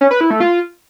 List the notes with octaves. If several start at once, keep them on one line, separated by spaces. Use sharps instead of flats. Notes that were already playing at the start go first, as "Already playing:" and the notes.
C#4
B4
E4
A3
F4